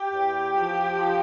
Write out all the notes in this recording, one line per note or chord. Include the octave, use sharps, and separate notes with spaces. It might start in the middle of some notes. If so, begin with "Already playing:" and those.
Already playing: G4
E2
F3
F3